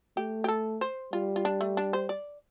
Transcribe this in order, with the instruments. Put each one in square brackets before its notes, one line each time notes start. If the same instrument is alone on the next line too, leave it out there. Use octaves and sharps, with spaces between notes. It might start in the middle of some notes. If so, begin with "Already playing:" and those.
[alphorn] A3 [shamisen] G4
[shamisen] G4
A4
C5
[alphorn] G3 [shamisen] F4
[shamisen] F4
D4
A3
D4
C5
D5